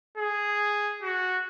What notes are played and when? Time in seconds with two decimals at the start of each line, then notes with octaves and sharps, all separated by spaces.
0.18 G#4
1.02 F#4